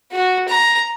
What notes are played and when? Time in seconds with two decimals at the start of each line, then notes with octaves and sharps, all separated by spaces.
0.12 F#4
0.48 A#5